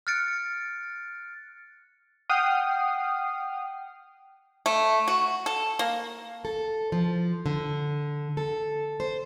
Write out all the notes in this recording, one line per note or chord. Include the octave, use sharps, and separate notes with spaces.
F6 F#6 A6 C#7 D7
F#5 G5 D#6 F6 C7
A3
F#4
A4
A#3
A4
F3
D3
A4
C5